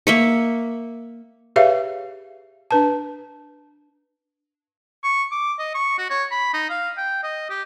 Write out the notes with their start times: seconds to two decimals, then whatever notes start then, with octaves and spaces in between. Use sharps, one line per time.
0.07 A#3 E5 C#6
1.56 G4 G#4 B4 C#5 E5 F5
2.71 D4 B4 A5
5.04 C#6
5.32 D6
5.59 D#5
5.75 C#6
5.99 F#4
6.10 C#5
6.31 B5
6.54 D#4
6.70 F5
6.97 G5
7.23 D#5
7.50 G4